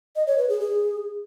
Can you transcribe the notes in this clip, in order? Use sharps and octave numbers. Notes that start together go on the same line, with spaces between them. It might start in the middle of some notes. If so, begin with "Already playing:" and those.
D#5
C#5
B4
G#4
G#4